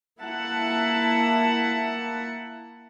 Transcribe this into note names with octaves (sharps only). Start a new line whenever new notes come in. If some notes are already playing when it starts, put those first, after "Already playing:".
A#3 E4 E5 F#5 A5